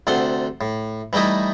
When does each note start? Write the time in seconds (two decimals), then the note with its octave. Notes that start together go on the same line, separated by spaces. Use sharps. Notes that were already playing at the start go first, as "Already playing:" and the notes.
0.07 D2 C3 A4 F#5 C6
0.61 A2
1.13 E3 G3 A3 D#4 E4